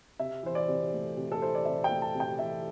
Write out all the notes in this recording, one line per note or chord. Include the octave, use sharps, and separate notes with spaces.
C3 E5
E3 C5
D5
C3
A3
C3
A4
E3 C5
D5
C3 E5
G5
A3
A5
C3
G5
E3 E5